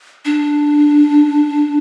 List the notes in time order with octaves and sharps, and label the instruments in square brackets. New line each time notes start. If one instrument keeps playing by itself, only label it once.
[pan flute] D4